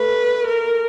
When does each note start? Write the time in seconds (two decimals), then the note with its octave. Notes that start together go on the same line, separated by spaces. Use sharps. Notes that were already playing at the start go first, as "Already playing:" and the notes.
Already playing: A3 B4
0.47 A#4